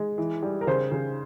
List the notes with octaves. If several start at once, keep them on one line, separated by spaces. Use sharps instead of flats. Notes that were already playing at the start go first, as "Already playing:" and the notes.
Already playing: G#3
E3
G3
A#4
C#3 C5
C#3